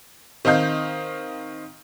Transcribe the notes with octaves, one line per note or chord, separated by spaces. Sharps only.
D#3 C4 D#5 F5 G6